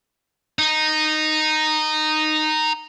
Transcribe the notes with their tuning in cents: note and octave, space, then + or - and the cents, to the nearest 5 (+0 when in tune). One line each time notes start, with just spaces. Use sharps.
D#4 -10